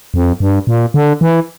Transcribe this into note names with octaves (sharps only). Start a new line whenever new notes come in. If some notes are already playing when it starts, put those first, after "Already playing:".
F2
G2
A#2
D3
E3